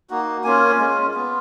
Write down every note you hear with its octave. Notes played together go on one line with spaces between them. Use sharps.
A#3 D#4 F#4
A#3 C#4 F4 G#5
G#3 C#4 F4
B3 F4